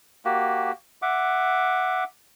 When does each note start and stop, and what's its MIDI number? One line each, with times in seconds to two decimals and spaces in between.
0.25 0.72 58
0.25 0.72 66
0.25 0.72 67
1.02 2.04 76
1.02 2.04 78
1.02 2.04 86